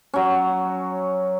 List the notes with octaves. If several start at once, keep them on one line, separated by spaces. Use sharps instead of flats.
F#3 C#4